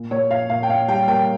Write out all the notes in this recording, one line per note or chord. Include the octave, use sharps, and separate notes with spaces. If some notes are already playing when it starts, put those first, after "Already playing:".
Already playing: A#2
A#2 C#5
A#2 F5
A#2 F5
G5
A#2 F5
G3 G5
A#3 G5